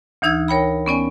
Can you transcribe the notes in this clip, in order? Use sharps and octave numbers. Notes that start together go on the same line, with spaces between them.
D2 E3 D#4 E6 G#6
A#4 C#5 G5 B5
B3 C#4 D5 G#5